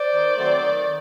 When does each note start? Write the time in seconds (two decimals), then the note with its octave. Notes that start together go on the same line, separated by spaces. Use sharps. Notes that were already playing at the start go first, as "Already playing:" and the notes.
Already playing: C5 D5
0.13 D#3
0.37 F#3 A3 C4
0.62 D#3